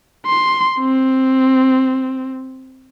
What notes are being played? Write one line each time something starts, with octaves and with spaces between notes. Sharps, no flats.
C6
C4